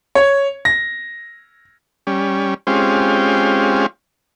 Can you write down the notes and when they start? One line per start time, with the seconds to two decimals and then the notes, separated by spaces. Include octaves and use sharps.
0.15 C#5
0.65 A#6
2.07 G3 C#4
2.67 G#3 C4 C#4 F4 G4